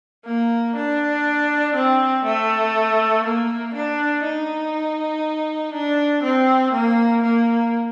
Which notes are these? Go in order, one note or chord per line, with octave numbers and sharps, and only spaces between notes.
A#3
D4
C4
A3
A#3
D4
D#4
D4
C4
A#3
A#3